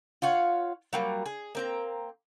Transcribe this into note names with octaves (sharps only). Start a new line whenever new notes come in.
F4 C#5 F5 F#5
F#3 G3 A#3
G#4
A#3 C4 A#5